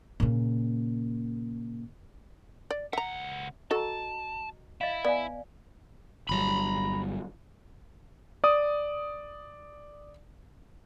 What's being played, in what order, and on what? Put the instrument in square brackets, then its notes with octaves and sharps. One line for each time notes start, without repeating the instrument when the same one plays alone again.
[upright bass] A#2 C#3
[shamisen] D5
[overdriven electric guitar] C#2 F#5 [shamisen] E5 A#5
[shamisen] F#4 A4 [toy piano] D#5 A#5 [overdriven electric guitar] A5
[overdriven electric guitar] E4 [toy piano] D#5 F5
[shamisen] B3 [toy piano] D5 F5 G#5
[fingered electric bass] G1 F#3 G3 [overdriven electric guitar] A#5 B5
[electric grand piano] D5 D#6